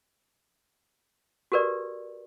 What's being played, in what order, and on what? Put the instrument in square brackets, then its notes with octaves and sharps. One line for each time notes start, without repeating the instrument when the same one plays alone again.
[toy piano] F#4 G4 A#4 B4 D5